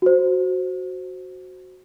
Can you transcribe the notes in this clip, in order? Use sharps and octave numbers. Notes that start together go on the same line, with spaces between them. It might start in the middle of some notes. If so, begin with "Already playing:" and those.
F#4 C5